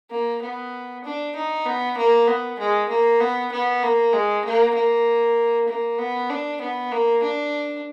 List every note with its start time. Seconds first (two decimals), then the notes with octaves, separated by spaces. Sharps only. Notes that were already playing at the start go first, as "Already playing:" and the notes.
0.11 A#3
0.42 B3
1.05 D4
1.36 D#4
1.66 B3
1.98 A#3
2.27 B3
2.59 G#3
2.89 A#3
3.20 B3
3.52 B3
3.83 A#3
4.13 G#3
4.45 A#3
4.75 A#3
5.68 A#3
5.99 B3
6.30 D4
6.61 B3
6.92 A#3
7.23 D4